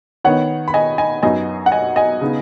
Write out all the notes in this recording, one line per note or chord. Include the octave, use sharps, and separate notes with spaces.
D#3 B3 D#4 C#5 F#5
B5
D#5 G#5
D#5 G#5
F#2 F#3 B3 D#4 D#5 G#5
F#5
D#5 G#5
D#5 G#5
C#3 B3 D#4